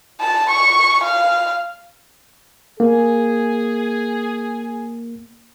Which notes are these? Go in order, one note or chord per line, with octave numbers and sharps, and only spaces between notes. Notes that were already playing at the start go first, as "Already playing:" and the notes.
A5
C#6
F5
A#3 G#4